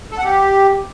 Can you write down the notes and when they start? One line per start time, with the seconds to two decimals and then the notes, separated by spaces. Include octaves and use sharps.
0.12 A4
0.18 F#5
0.25 G4